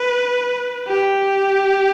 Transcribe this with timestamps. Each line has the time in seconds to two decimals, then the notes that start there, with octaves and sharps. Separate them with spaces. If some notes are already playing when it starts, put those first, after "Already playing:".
Already playing: B4
0.88 G4